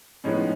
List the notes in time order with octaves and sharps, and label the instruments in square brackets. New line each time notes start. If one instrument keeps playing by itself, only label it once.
[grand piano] A2 F3 G#3 B3 C#4 D#4